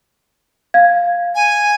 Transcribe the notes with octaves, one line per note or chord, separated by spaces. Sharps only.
F5 G#6
G#5